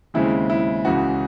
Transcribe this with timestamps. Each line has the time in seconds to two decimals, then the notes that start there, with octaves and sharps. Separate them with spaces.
0.14 D#2 C#3 G#3 C4 E4
0.50 E4
0.85 C#2 C#3 E3 F#4